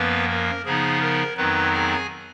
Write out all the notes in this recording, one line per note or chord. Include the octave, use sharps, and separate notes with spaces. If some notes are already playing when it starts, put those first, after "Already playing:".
Already playing: F#2 F3 A#3 B3 B4
A#4
C#3 F3 B3 D#4 G#4
A#4
F2 D#3 F#3 B3 D#4 B4
G#4 G#5